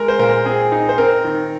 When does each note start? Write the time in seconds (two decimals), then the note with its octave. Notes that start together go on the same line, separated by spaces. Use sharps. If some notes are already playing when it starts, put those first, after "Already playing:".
Already playing: G#3 A#4
0.08 C5
0.19 A#2 A#4
0.45 C4 G#4
0.72 D#4
0.89 C5
0.98 C4 A#4
1.24 D#3